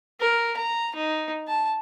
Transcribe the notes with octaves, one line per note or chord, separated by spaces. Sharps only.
A#4
A#5
D#4
A5